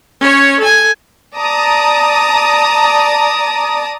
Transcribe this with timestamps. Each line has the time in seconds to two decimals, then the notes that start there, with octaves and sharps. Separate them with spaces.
0.21 C#4 C#5
0.60 A4 G#5
1.38 D5 A5 A#5 D#6